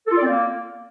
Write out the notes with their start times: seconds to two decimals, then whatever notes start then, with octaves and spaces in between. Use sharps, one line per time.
0.06 A4
0.12 F4
0.17 D5
0.22 C4
0.28 A#3